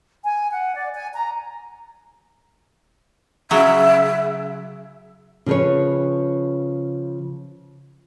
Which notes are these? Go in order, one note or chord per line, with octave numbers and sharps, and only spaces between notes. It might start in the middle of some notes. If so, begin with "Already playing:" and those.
G#5
F#5
D5
G#5
A#5
C#3 F#3 E5
C#3 F3 G#4 B4 C#5